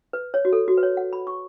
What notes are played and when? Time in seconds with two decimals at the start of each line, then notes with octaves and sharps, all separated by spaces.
0.13 B4
0.34 C#5
0.45 F#4
0.53 A4
0.68 F#4
0.78 B4
0.83 C#5
0.97 F#5
1.13 B5
1.27 C#6